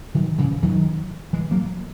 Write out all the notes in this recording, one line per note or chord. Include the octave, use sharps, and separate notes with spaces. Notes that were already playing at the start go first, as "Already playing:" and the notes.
D#3 F#3
C#3 E3
D#3 F#3
E3 G#3
F#3 A#3